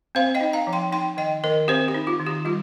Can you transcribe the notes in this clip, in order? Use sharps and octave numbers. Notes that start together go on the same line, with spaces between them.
C4 C5 F5
D#5 G5
D#4
F5 A#5
F3
G5 C6
D#4 G5 C6
D#3 D#5 G5
D#3 A#4 D#5
C4 G4 C5
G4
D#4
F4
D#3
G4
G3 F4